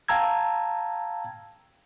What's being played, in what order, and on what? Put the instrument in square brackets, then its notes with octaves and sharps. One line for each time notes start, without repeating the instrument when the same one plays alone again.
[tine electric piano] F5 G5 A5 A#5 E6 G#6